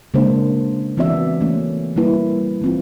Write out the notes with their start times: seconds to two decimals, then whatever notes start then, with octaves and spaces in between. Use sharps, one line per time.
0.14 C#3 G#3 A#3 D4 C5
0.97 E3 B3 C4 F#4 D5 E5
1.40 E3 A3 A#3 C#4
1.96 G3 A#3 E4 B4
2.62 E3 C4 F4